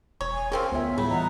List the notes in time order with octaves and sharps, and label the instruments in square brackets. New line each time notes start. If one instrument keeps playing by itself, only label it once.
[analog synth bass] E1 [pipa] C#5
[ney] G#5
[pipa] F3 C4 C#4 [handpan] G#4 [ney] A#4
[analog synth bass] D2 [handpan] B3 F4 E5 [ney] C#5
[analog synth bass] A2 [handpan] G3 G#4 [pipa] A3 [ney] B5
[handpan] E3 D#5 F#5 [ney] A#5